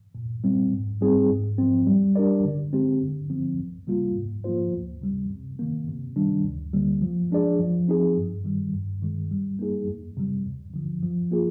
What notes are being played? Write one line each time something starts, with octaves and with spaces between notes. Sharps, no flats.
A#2
G3 C4
G#2
G3 C4 D#4 G#4
G#2
F3 C4
G3
D4 G4 A#4 D5
D3
G#3 C4 G4
D3
F3 C4
C2
C3 G3 A#3 F4
G#2
F3 A#3 F4 C5
D2
C3 G3
C3
D#3 A#3
C3
D#3 G3 D4
D2
D3 G3 A#3
F3
G#3 D4 G#4 D5
F3
C4 D#4 G#4
G2
D#3 G3
G2
D#3 G#3
G3
A#3 D#4 G#4
F2
C3 G3
D#2
D3 F3
F3
A#3 F4 G#4